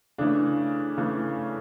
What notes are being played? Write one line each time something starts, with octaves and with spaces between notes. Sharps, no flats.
C#3 E3 A3 D4
C#3 E3 A3